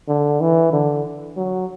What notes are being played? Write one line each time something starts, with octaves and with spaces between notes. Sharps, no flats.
D3
E3
D3
F#3